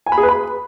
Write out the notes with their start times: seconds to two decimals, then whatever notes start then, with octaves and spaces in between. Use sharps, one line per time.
0.06 G#5
0.12 B5
0.18 G#4
0.23 B4
0.29 B5